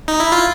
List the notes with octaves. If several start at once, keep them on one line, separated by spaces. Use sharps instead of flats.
D#4
E4
F4